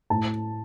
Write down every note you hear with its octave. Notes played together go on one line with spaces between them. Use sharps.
A2 A5